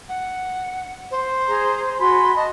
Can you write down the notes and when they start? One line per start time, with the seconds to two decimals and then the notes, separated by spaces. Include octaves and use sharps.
0.09 F#5
1.11 C5
1.48 G#4 A#5
1.99 F#4 G#5 B5 C6
2.36 D#5 A5